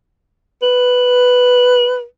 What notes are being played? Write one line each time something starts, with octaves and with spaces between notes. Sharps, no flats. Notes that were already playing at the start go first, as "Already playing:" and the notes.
B4